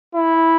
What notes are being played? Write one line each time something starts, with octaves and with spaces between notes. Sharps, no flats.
E4